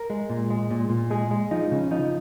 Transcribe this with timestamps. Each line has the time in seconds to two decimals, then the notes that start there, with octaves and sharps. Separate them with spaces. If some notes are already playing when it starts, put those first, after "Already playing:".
Already playing: A#4
0.10 G#3
0.30 A#2
0.50 G#3
0.71 A#2
0.90 A#2
1.10 G#3 G#4
1.31 G#3
1.51 F3 D#4
1.71 C#3
1.91 F3 D#4